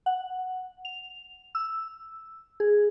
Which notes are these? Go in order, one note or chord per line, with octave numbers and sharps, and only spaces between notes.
F#5
F7
E6
G#4